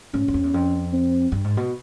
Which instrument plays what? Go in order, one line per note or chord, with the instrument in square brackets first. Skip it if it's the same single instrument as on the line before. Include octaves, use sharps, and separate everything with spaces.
[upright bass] G#2 [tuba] C#4
[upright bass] E2
F2
E2
F2
[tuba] C4
[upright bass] G2
G#2
B2